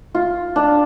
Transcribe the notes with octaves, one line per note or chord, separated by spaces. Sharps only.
F4
D4